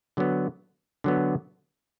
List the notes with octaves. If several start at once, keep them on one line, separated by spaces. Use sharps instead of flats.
D3 F#3 B3
D3 F#3 B3